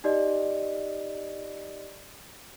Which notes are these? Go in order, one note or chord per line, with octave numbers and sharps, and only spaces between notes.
D#4 G4 D5 D#5